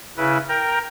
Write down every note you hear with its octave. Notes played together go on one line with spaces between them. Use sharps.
C#3 E4 B4
A#4 G5 A#5